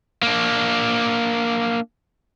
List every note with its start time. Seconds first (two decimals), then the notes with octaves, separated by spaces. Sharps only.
0.23 A#3 D4